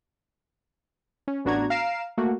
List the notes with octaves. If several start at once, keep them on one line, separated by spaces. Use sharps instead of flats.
C#4
A1 B3 D4 F#4 A#5 G#6
F5 A#5 C7 D7 E7
A3 A#3 F#4